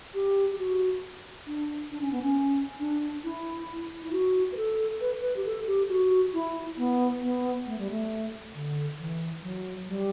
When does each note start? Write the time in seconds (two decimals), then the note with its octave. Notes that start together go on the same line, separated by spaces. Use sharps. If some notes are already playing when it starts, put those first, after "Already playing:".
0.14 G4
0.52 G4
0.59 F#4
1.47 D4
1.91 D4
2.01 C#4
2.12 B3
2.22 C#4
2.79 D4
3.24 E4
4.03 E4
4.12 F#4
4.52 B4
4.57 A4
5.01 B4
5.20 B4
5.36 G4
5.45 A4
5.67 G4
5.89 F#4
6.34 E4
6.77 B3
7.22 B3
7.66 A3
7.78 G3
7.91 A3
8.55 D3
8.99 E3
9.43 F#3
9.87 G3